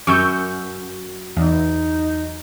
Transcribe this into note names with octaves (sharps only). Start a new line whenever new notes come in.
F#2 C#6 E6 G6
E2 D#4